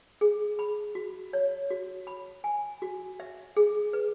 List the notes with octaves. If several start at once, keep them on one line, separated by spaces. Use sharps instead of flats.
G#4
B5
F#4
C#5
F#4
B5
G#5
F#4
E5
G#4
B4